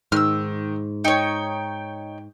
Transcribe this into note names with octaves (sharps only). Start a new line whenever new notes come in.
G#2 D#3 E6 F6
D#4 C#5 G5